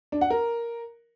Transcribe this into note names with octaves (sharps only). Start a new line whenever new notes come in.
D4
F#5
A#4